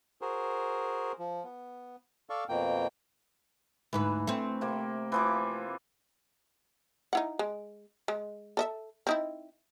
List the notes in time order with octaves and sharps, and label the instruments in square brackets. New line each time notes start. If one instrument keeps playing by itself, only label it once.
[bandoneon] F#4 G#4 A#4 C5
F3
B3
A4 D5 F5 C#6
F2 B2 A#3 G5
[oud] D2 G#2 B4 [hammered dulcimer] E3
[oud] A3 C4
[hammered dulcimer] C3 A#3
E3 F3 D6
[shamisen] D#4 E4 F#5
G#3
G#3
A4 D#5 E5
C4 D#4 E4